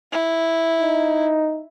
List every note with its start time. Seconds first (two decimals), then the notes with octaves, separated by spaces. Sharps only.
0.12 E4
0.81 D#4